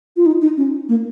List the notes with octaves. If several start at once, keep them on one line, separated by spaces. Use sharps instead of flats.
F4
D#4
D#4
C#4
A#3